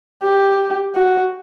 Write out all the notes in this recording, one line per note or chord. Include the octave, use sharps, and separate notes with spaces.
G4
F#4